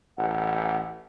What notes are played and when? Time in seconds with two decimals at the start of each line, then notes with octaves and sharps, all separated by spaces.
0.18 A1 F#5